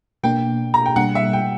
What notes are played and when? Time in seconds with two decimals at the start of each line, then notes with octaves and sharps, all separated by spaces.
0.23 B2 A#3 D4 G5
0.74 A#5
0.86 G5
0.96 B2 G3 A#3 D4 F#5
1.15 E5
1.33 G5